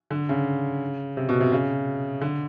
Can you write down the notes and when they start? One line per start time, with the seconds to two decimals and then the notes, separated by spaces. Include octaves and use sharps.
0.11 D3
0.29 C#3
1.17 C3
1.29 B2
1.40 C3
1.52 C#3
2.21 D3